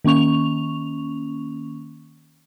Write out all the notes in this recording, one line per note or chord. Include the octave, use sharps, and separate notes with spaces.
D#3 A#3 C#4 C#6 F7